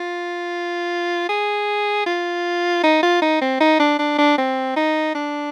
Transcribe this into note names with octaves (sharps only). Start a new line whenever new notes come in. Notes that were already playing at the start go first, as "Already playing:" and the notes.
Already playing: F4
G#4
F4
D#4
F4
D#4
C4
D#4
D4
D4
D4
C4
D#4
D4